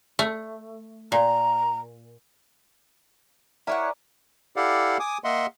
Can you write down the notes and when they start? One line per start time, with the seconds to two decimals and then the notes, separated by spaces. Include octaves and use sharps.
0.19 A3
1.12 A#2 A#5
3.67 E4 A#4 C#5 D5 F#5 G#5
4.56 E4 G4 A4 D5 F5 F#5
5.00 G#5 D6 D#6
5.24 A#3 D#5 E5 F#5 C6